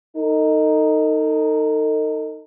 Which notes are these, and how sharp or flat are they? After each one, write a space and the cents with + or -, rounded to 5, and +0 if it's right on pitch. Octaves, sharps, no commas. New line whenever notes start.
D#4 +0 A4 +40